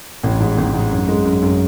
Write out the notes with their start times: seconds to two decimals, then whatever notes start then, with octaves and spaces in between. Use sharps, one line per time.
0.23 A1
0.40 G#2
0.58 A1
0.74 G#2
0.91 F#2
1.08 G#3
1.25 F#2
1.42 F#2